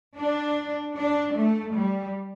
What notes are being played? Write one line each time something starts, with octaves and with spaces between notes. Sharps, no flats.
D4
D4
A3
G3